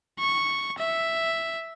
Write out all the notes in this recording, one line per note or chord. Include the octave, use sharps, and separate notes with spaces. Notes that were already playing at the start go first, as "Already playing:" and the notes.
C#6
E5